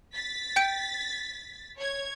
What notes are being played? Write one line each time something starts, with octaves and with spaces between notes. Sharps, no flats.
A6 B6
G5 G6 D7
C#5 G#6